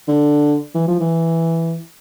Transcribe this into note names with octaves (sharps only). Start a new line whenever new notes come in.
D3
E3
F3
E3